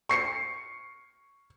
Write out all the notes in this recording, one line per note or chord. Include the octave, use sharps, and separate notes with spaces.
C#6 C7 C#7